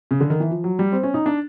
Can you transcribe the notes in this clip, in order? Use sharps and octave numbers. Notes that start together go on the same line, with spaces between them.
C#3
D3
D#3
E3
F3
F#3
G3
C4
C#4
D#4
D4